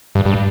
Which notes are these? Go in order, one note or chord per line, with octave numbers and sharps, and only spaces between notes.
G2
G2